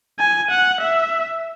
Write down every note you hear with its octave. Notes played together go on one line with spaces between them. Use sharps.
G#5
F#5
E5